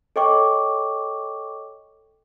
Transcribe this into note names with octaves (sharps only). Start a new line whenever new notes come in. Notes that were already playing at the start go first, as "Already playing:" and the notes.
A4 C#5 D#5 G5 C#6 D6